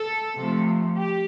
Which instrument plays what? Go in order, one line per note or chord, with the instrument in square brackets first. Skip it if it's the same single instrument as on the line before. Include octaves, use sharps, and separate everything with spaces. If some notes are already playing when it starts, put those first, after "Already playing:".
Already playing: [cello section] A4
C3 F3 A3
G4